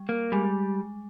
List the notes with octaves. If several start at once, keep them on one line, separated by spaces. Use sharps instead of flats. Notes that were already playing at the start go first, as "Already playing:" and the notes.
Already playing: G3
A#3
G3 G#3